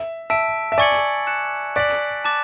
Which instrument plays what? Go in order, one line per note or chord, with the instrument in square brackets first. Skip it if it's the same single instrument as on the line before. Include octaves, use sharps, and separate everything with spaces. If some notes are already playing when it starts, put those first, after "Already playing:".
Already playing: [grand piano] E5
[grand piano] E5 [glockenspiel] A5 E6 B6 D7
[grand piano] E5
[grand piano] D5 [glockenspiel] G#5 C#6 G#6 C#7 F#7
[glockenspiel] F#6 C#7 E7
[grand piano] D5 [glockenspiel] F#6 B6 D7 F#7
[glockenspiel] A5 D6 F#6 A6 E7